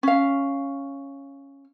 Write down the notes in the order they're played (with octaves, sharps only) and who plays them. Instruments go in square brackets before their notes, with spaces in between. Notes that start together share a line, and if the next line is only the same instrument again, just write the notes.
[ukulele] C#4 F5